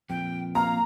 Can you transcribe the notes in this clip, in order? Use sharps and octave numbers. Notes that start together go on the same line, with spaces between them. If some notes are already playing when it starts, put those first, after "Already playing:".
F2 A#2 G5
A#3 F5 A#5